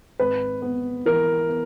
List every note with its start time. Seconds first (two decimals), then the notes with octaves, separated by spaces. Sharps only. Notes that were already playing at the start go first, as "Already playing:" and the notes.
0.19 G#1 B4
0.62 B3
1.06 E3 A#4
1.49 B3